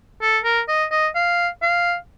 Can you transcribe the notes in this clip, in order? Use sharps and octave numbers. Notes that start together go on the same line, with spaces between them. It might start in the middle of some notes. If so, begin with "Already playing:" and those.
A4
A#4
D#5
D#5
F5
F5